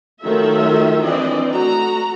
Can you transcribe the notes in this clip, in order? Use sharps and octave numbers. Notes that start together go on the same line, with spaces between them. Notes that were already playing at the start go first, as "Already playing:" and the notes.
D#3 F#3 A3 F4 A4 E5
E3 C4 D4 D5 D#5
A3 F#4 A#5